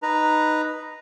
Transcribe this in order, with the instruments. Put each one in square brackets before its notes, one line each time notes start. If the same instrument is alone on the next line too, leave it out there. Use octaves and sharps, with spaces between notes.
[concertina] D#4 B4 A#5